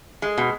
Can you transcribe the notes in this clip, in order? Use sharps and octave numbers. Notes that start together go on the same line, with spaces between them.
G#3
B2